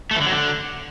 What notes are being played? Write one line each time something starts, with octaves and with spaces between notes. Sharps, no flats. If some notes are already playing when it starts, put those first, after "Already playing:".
A3
E3
D3
F#3
D3